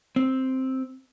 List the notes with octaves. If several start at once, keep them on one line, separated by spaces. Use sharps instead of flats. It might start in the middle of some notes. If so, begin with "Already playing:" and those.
C4